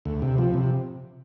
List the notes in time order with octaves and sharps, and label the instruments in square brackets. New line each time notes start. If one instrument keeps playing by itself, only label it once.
[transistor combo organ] D2
C3
F3
C3